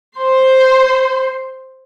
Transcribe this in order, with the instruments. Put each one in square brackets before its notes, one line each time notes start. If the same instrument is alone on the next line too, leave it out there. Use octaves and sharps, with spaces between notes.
[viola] C5 C6